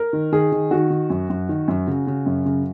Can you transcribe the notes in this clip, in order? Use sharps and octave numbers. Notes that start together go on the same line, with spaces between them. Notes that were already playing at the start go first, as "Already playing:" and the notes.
Already playing: A#4
D#3
D#3 G#4
D#3
D#3 F#4
D#3
F#2
F#2
D#3
F#2
C#3
C#3
F#2
C#3